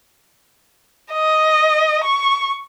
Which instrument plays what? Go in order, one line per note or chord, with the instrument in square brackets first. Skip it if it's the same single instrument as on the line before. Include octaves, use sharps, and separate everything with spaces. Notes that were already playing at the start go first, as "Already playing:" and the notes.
[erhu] D#5
C#6